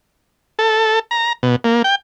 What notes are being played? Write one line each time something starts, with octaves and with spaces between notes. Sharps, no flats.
A4
A#5
B2
A#3
G5